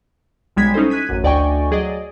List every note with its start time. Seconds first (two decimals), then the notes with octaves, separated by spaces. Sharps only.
0.57 B1 G3 G#3 G#6 B6
0.74 C#4 D#4 E4 A4 C5
0.90 F#6 G#6 B6 D#7
1.09 A1 F#2
1.24 D2 D5 D#5 G5 G#5 C#6
1.71 F#3 G#4 D5 D#5